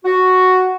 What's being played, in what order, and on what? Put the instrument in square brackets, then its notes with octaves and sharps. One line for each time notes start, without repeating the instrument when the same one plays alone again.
[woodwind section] F#4